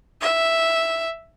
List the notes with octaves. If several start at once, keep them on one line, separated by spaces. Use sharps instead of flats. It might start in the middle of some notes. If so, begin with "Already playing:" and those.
E5